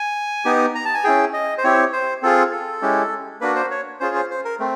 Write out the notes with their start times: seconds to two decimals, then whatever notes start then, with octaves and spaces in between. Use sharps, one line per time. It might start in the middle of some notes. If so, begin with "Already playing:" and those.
Already playing: G#5
0.45 B3 D#4 G4
0.75 A#5
0.85 A5
0.95 G#5
1.04 C#4 E4 G#4 G5
1.33 D#5
1.58 C5
1.64 C4 E4 G4 C#5
1.93 C5
2.22 C4 F4 G#4 A4
2.52 A4
2.82 G#3 C#4 E4 G4
3.41 A#3 D4 F#4 B4
3.55 C5
3.71 C#5
4.00 C#4 F4 G#4 C5
4.15 C5
4.30 C5
4.45 A#4
4.60 A3 C4